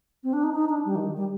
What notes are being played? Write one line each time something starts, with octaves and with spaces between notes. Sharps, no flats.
C4
D4
D#4
D#4
D4
G3
D#3
G3